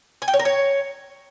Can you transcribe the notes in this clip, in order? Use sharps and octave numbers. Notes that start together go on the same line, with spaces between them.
G#5
G5
C#5
A#4
C#5